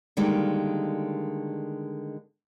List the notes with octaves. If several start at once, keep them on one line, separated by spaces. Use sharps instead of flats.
D3 D#3 G3 G#3 A#3